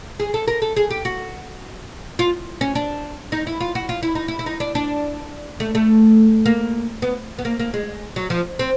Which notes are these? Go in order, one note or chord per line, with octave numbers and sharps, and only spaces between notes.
G#4
A4
A#4
A4
G#4
G4
F#4
F4
C#4
D4
D#4
E4
F4
F#4
F4
E4
D#4
E4
E4
D#4
D4
D4
A3
A3
A#3
B3
B3
A#3
A#3
G#3
F#3
F3
C4